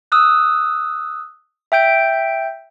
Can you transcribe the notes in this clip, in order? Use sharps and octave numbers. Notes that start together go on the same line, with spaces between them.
D#6 E6 F#6
E5 G5 G6 D7